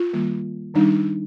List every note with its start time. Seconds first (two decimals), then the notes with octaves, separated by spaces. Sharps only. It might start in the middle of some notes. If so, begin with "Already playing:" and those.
Already playing: F4
0.13 D#3 G3 A#3
0.74 D#3 G3 D4 D#4